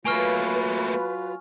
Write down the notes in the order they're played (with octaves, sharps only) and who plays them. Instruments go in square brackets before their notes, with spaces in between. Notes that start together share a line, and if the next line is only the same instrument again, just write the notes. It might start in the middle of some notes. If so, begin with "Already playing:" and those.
[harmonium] F#3 F4 [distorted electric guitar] A3 A#3 [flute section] B4 [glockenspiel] G#5 C#6 F6